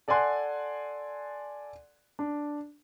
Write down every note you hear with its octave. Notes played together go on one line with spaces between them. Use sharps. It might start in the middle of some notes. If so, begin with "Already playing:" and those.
A4 D5 F#5 G#5 C6 F#6
D4